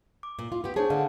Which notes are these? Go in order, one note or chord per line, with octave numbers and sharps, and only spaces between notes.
D6
A#2
F4
B3 G4
D4 G#4 C5 C#5 A5
D3 G#4 F5 F#5